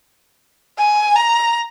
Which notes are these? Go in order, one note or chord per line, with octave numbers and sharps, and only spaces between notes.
G#5
A#5